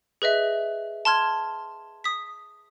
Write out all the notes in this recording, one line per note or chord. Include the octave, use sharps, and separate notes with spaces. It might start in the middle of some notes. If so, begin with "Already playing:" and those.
G#4 B4 D#5 E5
A5 C6 F6 G#6
D#6 B6